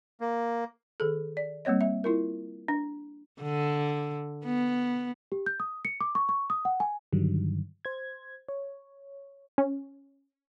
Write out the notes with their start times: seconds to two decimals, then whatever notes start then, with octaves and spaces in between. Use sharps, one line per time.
0.20 A#3
1.00 D#3 G#4 A4
1.37 D5
1.65 G3 A#3 C4 C#5 D#5
1.81 E5
2.04 E4 F4 A#4
2.68 D4
3.42 D3
4.45 B3
5.32 G4
5.46 G6
5.60 D#6
5.85 C#7
6.01 D6
6.15 C#6
6.29 C#6
6.50 D#6
6.65 F#5
6.80 G#5
7.13 G2 D3 D#3 F#3 G3
7.85 C5 G#6
8.49 C#5
9.58 C#4